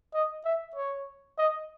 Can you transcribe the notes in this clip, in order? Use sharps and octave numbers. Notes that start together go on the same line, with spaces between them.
D#5
E5
C#5
D#5